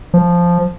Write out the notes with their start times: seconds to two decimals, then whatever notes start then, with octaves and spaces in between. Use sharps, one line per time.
0.14 F3